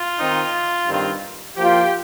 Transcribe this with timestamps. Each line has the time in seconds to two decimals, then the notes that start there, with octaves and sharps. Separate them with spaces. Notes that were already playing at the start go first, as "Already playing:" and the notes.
Already playing: F4
0.19 D#3 C4 D#4
0.88 G2 D#3 C4 F4
1.57 F3 A#3 F4 G4